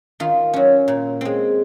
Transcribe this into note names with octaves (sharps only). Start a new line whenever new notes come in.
D#3 F4
F#3 C#4
A#2
G#3 C4